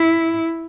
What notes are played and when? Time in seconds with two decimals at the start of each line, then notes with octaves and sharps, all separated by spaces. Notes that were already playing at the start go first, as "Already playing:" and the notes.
Already playing: E4